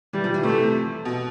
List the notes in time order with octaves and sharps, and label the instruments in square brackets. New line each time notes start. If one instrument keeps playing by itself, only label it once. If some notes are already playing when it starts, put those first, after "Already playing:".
[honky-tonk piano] E3 [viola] G3
[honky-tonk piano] F3
E3
[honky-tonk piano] C3 [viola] A3
[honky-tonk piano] B2